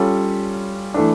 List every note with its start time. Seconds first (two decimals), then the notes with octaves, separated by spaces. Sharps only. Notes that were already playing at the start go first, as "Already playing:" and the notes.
Already playing: G3 C#4 F4 A4
0.94 E3 A3 D4